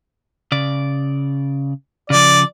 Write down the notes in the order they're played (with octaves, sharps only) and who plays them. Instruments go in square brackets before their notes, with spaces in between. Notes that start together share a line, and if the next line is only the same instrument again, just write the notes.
[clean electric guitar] C#3 D5
[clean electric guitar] C#3 F3 [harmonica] D5